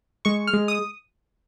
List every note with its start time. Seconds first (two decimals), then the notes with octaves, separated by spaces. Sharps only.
0.25 G#3 C#6
0.47 F6
0.54 G#3
0.68 D#6